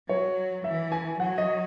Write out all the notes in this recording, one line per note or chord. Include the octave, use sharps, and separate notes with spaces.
F#3 C#5
E3 E5
G#5
F#3 F#5
D#5